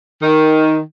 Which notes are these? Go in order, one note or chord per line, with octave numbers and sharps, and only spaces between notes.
D#3